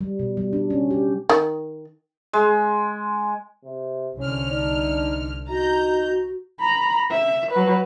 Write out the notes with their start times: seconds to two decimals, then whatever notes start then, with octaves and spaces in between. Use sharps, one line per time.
0.01 G3
0.19 B2
0.37 G3
0.53 D4
0.70 C#4
0.91 G4
1.30 D#3
2.33 G#3
3.64 C3
4.19 C2 D3 C#4 F6
4.50 D4 D#4
5.49 D#4 F#4 A#5 G6
6.60 A#5 B5
7.11 E5
7.52 F#3 B4